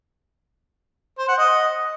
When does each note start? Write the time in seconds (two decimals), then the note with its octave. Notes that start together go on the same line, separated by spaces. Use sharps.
1.18 C5
1.28 F#5
1.38 D#5